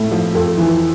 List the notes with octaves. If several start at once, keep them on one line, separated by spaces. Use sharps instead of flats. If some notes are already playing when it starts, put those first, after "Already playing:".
Already playing: A2 A3
F3
F2 A4
E3